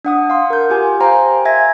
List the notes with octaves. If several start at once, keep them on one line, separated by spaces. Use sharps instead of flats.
D4 F#5 D#6
F5 C6
A#4 G6
F4 G4 G#5
C5 F5 G5 G#5 A#5 C6
E5 G#5 G#6 A#6